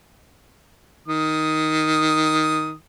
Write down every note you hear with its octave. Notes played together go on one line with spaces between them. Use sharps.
D#3 D#6